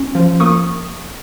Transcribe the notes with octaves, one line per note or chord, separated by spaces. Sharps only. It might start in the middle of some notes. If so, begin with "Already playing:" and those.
Already playing: C#4
F3
A#3 C#6 D#6